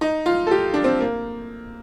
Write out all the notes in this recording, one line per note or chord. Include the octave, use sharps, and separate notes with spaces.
D#4
F4
A4
G4
D4
C4
A#3